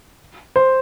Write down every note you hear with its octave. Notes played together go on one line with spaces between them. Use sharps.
C5